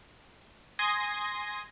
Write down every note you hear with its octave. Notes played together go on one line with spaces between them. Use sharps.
G#5 C6 D#6 G#6 A#6